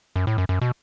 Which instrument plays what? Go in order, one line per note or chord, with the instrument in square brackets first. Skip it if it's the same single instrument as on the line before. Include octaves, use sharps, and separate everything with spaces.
[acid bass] F#2
A2
F#2
F#2
B2